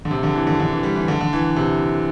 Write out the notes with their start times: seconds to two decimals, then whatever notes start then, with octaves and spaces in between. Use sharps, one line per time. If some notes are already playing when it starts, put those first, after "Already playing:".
0.05 D3
0.11 C3
0.23 D3
0.35 E3
0.47 D3
0.60 D3
0.72 E3
0.83 G3
0.95 E3
1.08 D3
1.21 D3
1.33 E3
1.44 E3
1.56 C3